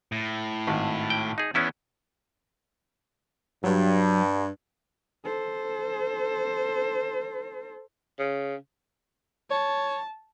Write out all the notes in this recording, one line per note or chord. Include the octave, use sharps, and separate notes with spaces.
A2
G#1
G5
D#4 G#4
E2 B3 C#4 E4
G2 F#3
A4 C5
C#3
C#5 A5